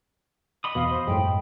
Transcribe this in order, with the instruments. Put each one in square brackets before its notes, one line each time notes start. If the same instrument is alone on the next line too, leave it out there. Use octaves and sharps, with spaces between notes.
[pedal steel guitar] D#5 B5 D#6
[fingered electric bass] E2 [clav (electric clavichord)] B2 [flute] F5
[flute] C5
[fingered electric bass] F#2 [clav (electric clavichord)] A2 G#3 [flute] G5